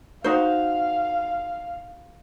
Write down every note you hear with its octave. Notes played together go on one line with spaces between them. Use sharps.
D#4 F#4 C5 F5